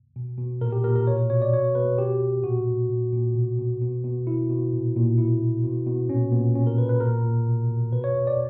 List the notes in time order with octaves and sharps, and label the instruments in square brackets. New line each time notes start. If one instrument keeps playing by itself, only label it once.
[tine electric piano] B2
B2
A#2 A#4
G4
A#2 A#4
A#4
B2 C#5
B2 C#5
D5
B2 C#5
B2 B4
B2 G4
B2
A#2 F#4
A#2
A#2
A#2
B2
B2
B2
B2
B2 E4
B2
A#2
A#2
B2 E4
B2
B2
B2
A#2 C#4
A#2 B3
B2 C#4
A#4
B2 B4
B4
A#2 A#4
A#2
B2
B2
B2 B4
C#5
B2
D5